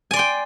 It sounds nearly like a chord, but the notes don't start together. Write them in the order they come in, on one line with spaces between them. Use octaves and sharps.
G#5 D5 C6 G5